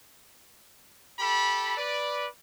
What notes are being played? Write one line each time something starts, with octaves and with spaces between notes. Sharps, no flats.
G4 A4 B5
B4 D5